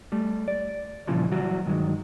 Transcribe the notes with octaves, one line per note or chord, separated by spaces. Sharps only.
G3 A3
D5
A#2 C#3 E3 F3 G3
E3 F#3 G3 F#4
G2 D#3 F#3 G#3